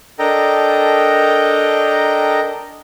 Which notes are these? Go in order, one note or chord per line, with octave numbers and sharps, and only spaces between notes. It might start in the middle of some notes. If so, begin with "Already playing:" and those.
D4 A4 A#4 D#5 G5 A#5